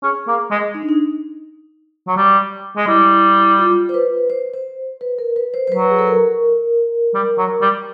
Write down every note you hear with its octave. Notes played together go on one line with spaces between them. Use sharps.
C#4 G#4
A#3
G#3
D#4
D4
D#4
F#3
G3
G#3
G3 E4
F4
C5
B4
C5
C5
B4
A#4
B4
C5
C5
F#3 B4
G#4
A4
A#4
G3
F#3
G3